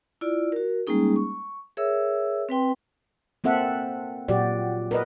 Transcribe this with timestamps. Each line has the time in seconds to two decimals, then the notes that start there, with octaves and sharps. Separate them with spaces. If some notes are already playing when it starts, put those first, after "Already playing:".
0.21 E4 F4 D5
0.52 F#4 A#4
0.87 G3 G#3 A#3 C#4 D#4 G#4
1.16 C#6
1.77 G#4 A#4 C#5 E5 E6
2.49 C4 B4 G5 C6
3.44 A#3 C4 A4 E5 F#5
4.28 A#2 F#3 F#4 G4 D5
4.91 A#4 B4 D#5